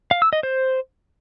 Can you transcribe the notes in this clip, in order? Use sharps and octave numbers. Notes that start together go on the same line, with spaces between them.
F5
E6
D#5
C5